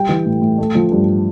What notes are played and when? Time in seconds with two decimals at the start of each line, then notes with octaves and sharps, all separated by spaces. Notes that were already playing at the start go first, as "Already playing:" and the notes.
Already playing: G3 G5
0.09 E3
0.26 A2
0.42 A2
0.58 A3
0.75 F3
0.92 G2